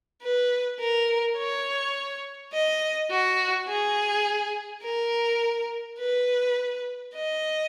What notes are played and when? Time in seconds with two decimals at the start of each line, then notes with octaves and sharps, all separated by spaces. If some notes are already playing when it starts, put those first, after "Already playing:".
0.22 B4
0.79 A#4
1.37 C#5
2.53 D#5
3.11 F#4
3.68 G#4
4.84 A#4
5.99 B4
7.14 D#5